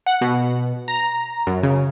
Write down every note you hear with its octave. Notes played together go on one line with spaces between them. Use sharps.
F#5
B2
A#5
F#2
C#3